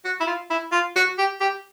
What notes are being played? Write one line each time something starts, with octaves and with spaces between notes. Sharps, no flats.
F#4
E4
F4
E4
F4
F#4
G4
G4